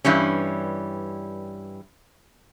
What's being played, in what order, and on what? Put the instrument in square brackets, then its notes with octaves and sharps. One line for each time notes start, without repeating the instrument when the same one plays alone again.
[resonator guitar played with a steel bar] G2 E3 G3 C#4